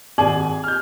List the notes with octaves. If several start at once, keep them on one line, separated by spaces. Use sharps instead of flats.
G#1 G#4 D5 G#5 G#6 F#7
F6 G6